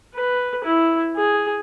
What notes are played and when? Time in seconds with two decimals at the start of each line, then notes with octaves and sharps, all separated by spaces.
0.15 B4
0.64 E4
1.16 G#4